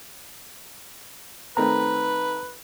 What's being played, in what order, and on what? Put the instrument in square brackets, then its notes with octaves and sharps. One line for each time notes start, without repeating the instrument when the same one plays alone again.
[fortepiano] D#3 A3 C4 [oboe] B4 [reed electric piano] A#5